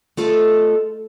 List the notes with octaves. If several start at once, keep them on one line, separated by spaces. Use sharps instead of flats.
A3 F4 A4 D#5